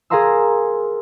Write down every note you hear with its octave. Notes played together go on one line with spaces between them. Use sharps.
G#4 A#4 F5 A#5 C6 E6